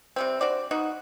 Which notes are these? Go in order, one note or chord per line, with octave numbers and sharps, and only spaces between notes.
C3 G3 C4
D4 F#4 C5 D5
B2 D#4 F#4